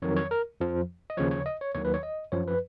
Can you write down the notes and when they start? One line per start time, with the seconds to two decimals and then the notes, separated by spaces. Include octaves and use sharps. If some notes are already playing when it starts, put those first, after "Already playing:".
0.02 F2 D#3 F#3 C#5
0.16 C#5
0.31 A#4
0.60 F2 F3
1.10 D#5
1.17 D#2 C#3 F3 C#5
1.31 C#5
1.46 D#5
1.61 C#5
1.75 D#2 D#3 F#3 C#5
1.85 B4
1.94 C#5
2.03 D#5
2.32 F#2 F3 C#5
2.47 B4